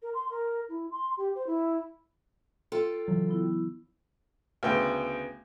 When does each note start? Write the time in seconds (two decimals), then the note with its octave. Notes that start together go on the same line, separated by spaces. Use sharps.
0.02 A#4
0.14 C6
0.30 A#4
0.69 E4
0.91 C6
1.17 G4
1.35 C5
1.47 E4
2.72 F4 A4 G5
3.08 C#3 E3 F#3
3.29 B3 E4
4.63 D2 C#3 B3 G5